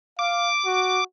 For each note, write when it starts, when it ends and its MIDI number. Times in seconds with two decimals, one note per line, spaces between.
0.19 0.49 77
0.19 1.04 86
0.66 1.02 66